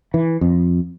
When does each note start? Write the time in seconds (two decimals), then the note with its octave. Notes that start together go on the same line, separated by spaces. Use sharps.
0.14 E3
0.41 F2